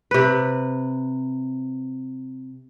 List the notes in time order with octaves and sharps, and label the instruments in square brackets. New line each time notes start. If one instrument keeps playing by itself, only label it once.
[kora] C3 B4